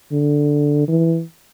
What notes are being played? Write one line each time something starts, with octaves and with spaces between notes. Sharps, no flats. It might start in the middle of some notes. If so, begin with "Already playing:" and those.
D3
E3